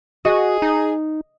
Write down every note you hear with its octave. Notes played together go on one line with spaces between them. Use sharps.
F#4 G#4 D#5
D#4